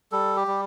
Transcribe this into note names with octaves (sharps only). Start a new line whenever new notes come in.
G3 A4
G4
G3